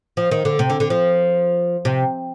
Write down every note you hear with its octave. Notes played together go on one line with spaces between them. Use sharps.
F3
D#3
D3
C3
D3
D3
F3
C3